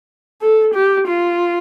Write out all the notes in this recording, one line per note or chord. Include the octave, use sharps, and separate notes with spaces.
A4
G4
F4